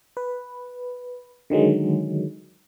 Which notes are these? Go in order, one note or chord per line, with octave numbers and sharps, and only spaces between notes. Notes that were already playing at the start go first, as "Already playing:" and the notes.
B4
D3 D#3 F#3 G#3